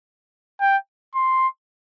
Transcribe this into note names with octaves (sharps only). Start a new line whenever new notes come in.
G5
C6